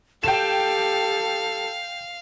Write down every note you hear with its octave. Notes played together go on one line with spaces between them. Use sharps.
G4 A4 F5 G5 E7